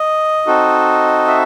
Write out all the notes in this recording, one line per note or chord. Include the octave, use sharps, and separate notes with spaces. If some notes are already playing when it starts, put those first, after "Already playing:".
Already playing: D#5
C4 D#4 F#4 A4
E5